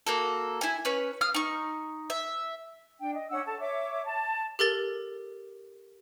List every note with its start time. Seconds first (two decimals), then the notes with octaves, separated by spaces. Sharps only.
0.06 A#3 F#4 A4
0.61 E4 G#5
0.85 C#4 B4 C#5
1.21 F5 D#6 F6
1.34 D#4 C#6
2.10 E5
2.99 D4 G5
3.15 D#5
3.30 C#4 D4 F#5 E6
3.46 A4 A5
3.60 C#5 E5 D6
4.06 A5
4.59 G4 A4 A#4 A6 G7